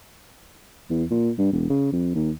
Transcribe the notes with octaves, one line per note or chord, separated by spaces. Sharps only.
E2
A#2
G2
E1
C#3
F2
D#2